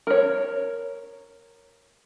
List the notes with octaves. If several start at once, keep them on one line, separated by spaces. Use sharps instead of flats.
A#4 C#5